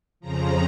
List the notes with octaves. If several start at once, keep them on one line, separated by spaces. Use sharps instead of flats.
F2 C#3 F3 A#5